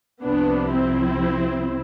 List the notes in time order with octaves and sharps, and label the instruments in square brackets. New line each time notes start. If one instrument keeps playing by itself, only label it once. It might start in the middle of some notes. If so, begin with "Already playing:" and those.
[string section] C2 C3 F3 B3 D4
C4 E4